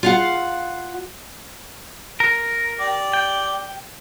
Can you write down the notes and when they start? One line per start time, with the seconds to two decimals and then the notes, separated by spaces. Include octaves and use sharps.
0.03 F4 F5 F#5
2.20 A#4
2.80 G4 D5
3.13 G5